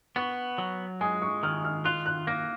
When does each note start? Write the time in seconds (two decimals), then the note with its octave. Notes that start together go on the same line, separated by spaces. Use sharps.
0.16 B3 C#6
0.58 F#3
1.01 G#3 G#5
1.22 C#6
1.43 D#3 F6
1.64 F6
1.85 F4 F#6
2.06 F#6
2.27 A#3 A#6